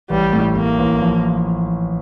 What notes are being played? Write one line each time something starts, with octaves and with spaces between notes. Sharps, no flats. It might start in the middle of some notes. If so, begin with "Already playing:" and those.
A1 G3
A2
A2 A#3
A1
F3